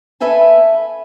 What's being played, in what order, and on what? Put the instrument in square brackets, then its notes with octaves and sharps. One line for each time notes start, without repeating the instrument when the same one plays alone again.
[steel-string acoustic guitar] A4 B4 E5 G#5 A5